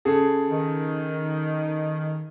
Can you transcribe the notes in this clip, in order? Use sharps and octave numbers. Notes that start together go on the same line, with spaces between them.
C#3 G#4 A4
D#3